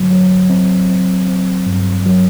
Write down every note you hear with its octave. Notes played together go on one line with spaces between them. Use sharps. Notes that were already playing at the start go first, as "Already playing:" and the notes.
Already playing: G2 D3 F#3
F#3
C4
C4
C4
G2
F#3